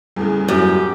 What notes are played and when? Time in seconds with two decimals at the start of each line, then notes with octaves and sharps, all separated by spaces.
0.16 E2 A2 C#3 G3
0.48 F#2 G4